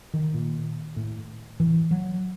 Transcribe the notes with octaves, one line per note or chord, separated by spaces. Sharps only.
D#3
A#2
A2
A2 E3
F#3